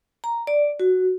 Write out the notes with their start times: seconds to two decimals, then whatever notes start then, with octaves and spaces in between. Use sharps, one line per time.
0.24 A#5
0.47 D5
0.80 F#4